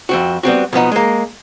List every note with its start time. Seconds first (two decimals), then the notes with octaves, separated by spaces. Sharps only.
0.09 F2 C4 F#4
0.43 G3 B3 C4 F#4
0.73 B2 F3 B3 D#4
0.92 G#3 A#3